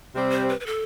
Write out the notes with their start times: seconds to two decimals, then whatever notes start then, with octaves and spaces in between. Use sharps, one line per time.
0.14 C3 G3 C4
0.31 C5
0.49 B4
0.60 B4
0.66 A4